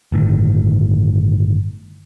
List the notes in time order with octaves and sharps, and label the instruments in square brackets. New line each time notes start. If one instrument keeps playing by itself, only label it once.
[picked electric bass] G1 A2 D3 D#3